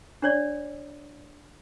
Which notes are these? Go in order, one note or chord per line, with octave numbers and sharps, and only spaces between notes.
D4 C#5 D5